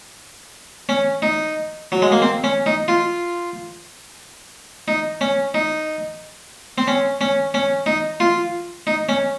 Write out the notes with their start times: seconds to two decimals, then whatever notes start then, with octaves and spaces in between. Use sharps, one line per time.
0.89 C#4
1.22 D#4
1.92 F#3
2.02 G#3
2.12 A#3
2.22 C4
2.44 C#4
2.66 D#4
2.88 F4
4.88 D#4
5.21 C#4
5.54 D#4
6.78 C4
6.88 C#4
7.21 C#4
7.54 C#4
7.86 D#4
8.20 F4
8.87 D#4
9.09 C#4